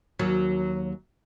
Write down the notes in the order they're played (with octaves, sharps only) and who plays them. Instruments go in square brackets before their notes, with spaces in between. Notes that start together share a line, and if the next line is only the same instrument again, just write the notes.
[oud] D#2 F#3